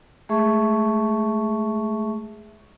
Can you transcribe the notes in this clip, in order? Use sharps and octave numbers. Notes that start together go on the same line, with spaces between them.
G#3 A3 G#4 E5 A5 C#6